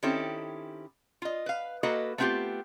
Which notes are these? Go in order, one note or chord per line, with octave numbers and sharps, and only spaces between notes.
D#3 C4 C#4 E4 G4 A4
F4 D#5
B4 F5
A#3 F#4 A4 B4 D#5 F5
A3 B3 C4 E4 F4 G4